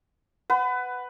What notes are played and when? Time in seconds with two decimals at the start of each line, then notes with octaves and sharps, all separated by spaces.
0.50 B4 F#5